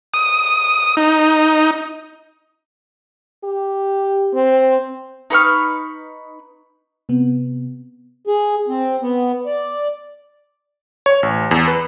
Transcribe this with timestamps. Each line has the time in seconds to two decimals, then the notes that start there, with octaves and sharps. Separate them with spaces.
0.14 D#6
0.97 D#4
3.44 G4
4.34 C4
5.30 D#4 B4 C#6 F6
7.09 C3 B3
8.27 G#4
8.68 C4
9.02 B3
9.46 D5
11.06 C#5
11.23 A1
11.51 E2
11.68 B4